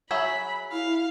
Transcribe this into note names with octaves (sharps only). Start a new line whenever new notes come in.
F#3 G#4 E5 B5
E4 F5